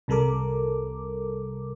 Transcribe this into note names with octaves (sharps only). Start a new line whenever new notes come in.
C2 C3 G3 A4 A#4 D6